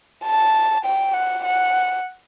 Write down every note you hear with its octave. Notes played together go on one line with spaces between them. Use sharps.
A5
G5
F#5
F#5